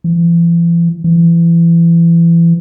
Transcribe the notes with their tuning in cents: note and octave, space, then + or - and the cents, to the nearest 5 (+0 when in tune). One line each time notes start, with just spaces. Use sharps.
E3 +45
E3 +30